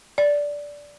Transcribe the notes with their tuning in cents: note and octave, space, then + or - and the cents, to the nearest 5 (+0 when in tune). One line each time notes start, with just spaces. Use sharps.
D5 -10